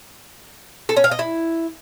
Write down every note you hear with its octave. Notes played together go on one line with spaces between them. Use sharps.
A4
C#4
F5
D#5
E4